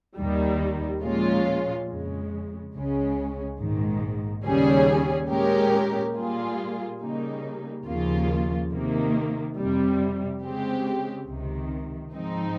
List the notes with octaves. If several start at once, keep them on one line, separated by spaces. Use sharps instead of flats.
D#2 D#3 G3
A#2 F3 G#3 C#4 F4
F2 C#3 G#3
C#2 C#3 G#3 C#4
A#1 G#2 D#3
D#2 C#3 G3 C#4 G#4
A#2 G#3 C#4 G4 A#4
A#2 G3 A#3 F4 G#4
C#3 G3 A#3 D#4
D#2 C#3 F3 A#3 F4
C3 D#3 A#3
F2 C3 G3
C#3 G#3 C4 G4
C#2 C3 D#3
G#2 F3 C4 D#4